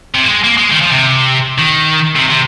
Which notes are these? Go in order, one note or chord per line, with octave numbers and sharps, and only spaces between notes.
C3
A#3
G#3
A#3
G#3
D#3
F3
C3
D#3
C3
C3